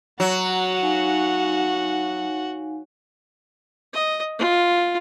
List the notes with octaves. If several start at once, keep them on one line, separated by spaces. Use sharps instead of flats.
F#3 F#4 F#5 A#5
D#4 F5 G#5
D#5
F4